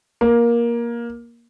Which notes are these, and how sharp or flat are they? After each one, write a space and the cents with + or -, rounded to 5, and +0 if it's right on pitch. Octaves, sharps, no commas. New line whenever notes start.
A#3 +15